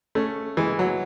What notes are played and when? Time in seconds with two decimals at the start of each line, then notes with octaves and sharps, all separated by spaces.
0.15 A3 C#4
0.57 E3 G#3
0.79 F#3